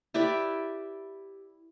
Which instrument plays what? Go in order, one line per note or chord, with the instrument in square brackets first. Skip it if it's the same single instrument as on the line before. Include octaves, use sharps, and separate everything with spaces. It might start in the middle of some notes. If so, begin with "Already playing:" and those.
[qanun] E4 G4 B4 D5